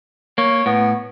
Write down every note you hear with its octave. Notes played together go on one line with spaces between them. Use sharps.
A#3 C#5
A2 B3